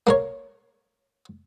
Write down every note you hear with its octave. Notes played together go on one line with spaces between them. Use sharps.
A#3 A#4 C#5